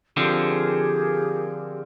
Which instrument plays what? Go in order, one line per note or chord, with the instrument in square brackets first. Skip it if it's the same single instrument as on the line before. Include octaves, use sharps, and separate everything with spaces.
[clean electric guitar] D3 F3 C4 [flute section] G4 G#4 A#4